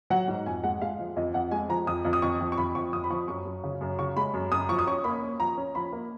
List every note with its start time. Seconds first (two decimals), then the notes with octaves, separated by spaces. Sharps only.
0.10 F#3 F#5
0.28 G#2
0.46 F2 G#5
0.64 G#3 F#5
0.81 G#3 F5
0.99 F3
1.16 F2 D#5
1.34 F2 F#5
1.51 G#3 G#5
1.69 F3 A#5
1.87 F2 D#6
2.05 F2
2.13 D#6
2.22 F2 C#6
2.40 F2
2.52 C#6
2.57 F2 B5
2.75 F2 C#6
2.93 F2 D#6
3.04 B5
3.10 F3 C#6
3.28 F#2 C#6
3.45 F#2
3.64 C#3
3.81 F#2
3.99 C#3 C#6
4.16 G#3 B5
4.34 F#2
4.52 F#2 D#6
4.69 F3 C#6
4.79 D#6
4.87 C#4 C#6
5.04 A#3 B5
5.22 C#4
5.40 F3 A#5
5.57 C#4
5.75 F3 B5
5.93 A#3